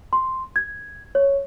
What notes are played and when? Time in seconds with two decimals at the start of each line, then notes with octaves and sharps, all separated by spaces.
0.13 C6
0.56 G#6
1.15 C#5